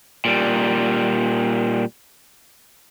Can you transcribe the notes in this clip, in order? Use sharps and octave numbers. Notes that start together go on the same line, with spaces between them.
A#2 G3